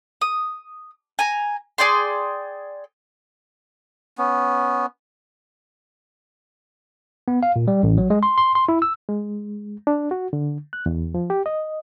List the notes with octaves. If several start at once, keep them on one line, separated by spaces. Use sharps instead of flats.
D#6
G#5 A#5
G#4 D5 G5 C6
B3 C#4
B3
F5
A#2
G3
A1
F#3
G#3
C6
C6
C6
E4
E6
G#3
D4
F#4
D3
F#6
E2
F3
G4
D#5